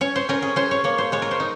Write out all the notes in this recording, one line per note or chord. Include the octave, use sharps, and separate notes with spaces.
C#4 C#5
C5
C#4 A#4
G#4
C#4 C5
C#5
A#3 C#5
C5
G#3 C#5
A#4
C5
D#4